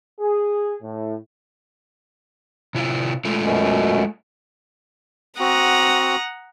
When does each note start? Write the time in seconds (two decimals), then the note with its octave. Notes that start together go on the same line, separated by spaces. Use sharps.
0.20 G#4
0.83 A2
2.75 C3 E4 F4
3.25 G#3 A3 F4
3.45 F#2 B2
5.40 C4 F#4 F#5 A#5 D#6